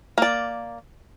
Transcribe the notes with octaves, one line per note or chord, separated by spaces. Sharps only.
A#3 D5